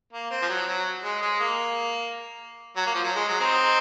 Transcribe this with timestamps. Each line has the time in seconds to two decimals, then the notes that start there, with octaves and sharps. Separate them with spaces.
0.13 A#3
0.31 C4
0.42 F3
0.49 F#3
0.67 F#3
1.04 G#3
1.22 G#3
1.40 A#3
2.76 F#3
2.86 A#3
2.95 F3
3.04 F#3
3.16 G#3
3.28 F#3
3.40 C4 D#4